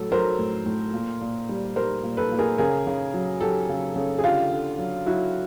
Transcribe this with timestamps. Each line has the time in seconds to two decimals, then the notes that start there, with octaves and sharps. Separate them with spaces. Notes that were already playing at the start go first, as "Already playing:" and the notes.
Already playing: A2 F#3 A4
0.11 F#3 A#4 C5
0.39 A2
0.66 A2
0.94 A#2
1.21 A#2
1.49 G3
1.76 G3 A#4 C5
2.03 A#2
2.17 A4 B4
2.32 A#2
2.39 G#4 A#4
2.58 C#3 G#4 A#4
2.87 C#3
3.14 F#3
3.41 F#3 G4 A4
3.69 C#3
3.96 C#3
4.19 G#4
4.24 D3 F4 G4
4.52 D3
4.78 F#3
5.06 F#3 E4 F#4